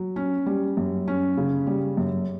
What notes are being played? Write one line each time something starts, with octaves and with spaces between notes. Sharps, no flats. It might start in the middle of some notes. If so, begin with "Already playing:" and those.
Already playing: F#3
C#4
G3
F#2
C#4
C#3
G3
F#2